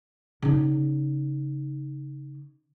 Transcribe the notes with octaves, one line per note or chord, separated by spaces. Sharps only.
C#3 D#4